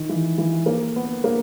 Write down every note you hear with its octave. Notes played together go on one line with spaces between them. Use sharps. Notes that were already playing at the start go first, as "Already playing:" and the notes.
Already playing: D#3
E3
E3
A#3
B3
A#3